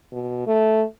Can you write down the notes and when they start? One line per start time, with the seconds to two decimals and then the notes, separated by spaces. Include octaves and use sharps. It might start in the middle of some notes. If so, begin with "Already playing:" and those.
0.12 B2
0.47 A3